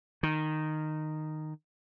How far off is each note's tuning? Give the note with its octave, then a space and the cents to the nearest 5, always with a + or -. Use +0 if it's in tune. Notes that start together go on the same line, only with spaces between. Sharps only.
D#3 -10